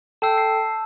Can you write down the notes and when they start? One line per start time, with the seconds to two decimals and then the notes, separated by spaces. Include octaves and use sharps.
0.22 A4 G5 A5 E6 G6 C7
0.38 C7